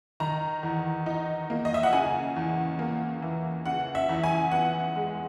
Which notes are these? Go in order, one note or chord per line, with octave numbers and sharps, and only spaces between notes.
D#3 A#5
E2
D#4
A#3
D#5
E5
F#5
C#3 G#5
E2
A#3
E3
C#3 F#5
E5
E2
G#5
B3 F#5
G#3